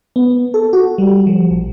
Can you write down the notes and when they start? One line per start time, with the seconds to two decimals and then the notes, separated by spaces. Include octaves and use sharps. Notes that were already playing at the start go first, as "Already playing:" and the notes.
0.16 B3
0.54 A4
0.73 F#4
0.98 G3
1.27 F3
1.51 A#1